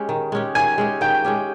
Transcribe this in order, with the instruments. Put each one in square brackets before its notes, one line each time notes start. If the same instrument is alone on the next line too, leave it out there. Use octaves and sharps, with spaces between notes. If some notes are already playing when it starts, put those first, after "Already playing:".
Already playing: [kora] G#3 C#4 G4
D#3
G#3 C#4 G4
[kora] D#3 [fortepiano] G#5
[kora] G#3 C#4 G4
[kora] D#3 [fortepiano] G5
[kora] G#3 C#4 G4